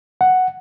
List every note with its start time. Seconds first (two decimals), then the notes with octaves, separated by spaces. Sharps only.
0.21 F#5